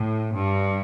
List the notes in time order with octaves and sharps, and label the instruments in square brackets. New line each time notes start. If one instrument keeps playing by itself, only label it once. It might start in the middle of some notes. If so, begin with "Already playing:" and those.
Already playing: [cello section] A2
G2